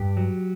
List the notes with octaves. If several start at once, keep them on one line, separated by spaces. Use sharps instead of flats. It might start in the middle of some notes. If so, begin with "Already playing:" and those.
Already playing: G2 G4
F#3